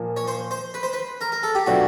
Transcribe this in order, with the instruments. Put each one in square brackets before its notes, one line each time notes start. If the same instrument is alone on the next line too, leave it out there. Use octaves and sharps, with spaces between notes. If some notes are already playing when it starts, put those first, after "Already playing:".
Already playing: [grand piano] A#2 F3 A#3
[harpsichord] C#5
C5
C5
B4
C5
B4
A#4
A#4
A4
G4
[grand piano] B2 F#3 A3 D4 F4 [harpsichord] F#4